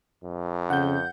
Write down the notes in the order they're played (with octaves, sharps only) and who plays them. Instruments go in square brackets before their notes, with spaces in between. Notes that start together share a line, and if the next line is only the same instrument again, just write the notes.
[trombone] F2
[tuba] C#3 [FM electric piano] F#5 G6